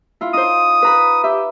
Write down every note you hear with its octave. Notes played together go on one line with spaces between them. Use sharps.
E4 F4
D#4 C5 D#6
B4 A#5 B5
G4 E5